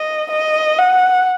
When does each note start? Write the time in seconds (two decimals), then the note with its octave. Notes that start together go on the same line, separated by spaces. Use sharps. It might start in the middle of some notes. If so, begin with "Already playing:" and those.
Already playing: D#5
0.31 D#5
0.79 F#5